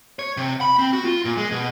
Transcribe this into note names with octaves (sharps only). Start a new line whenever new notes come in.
C#5
C3
B5
C4
F#4
F4
A#2
G#3
B2